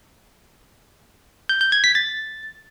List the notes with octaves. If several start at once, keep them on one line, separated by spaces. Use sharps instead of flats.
G6
G6
G#6
B6
A6